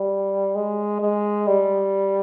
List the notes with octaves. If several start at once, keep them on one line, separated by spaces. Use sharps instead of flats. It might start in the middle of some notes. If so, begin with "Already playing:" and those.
Already playing: G3
G#3
G#3
G3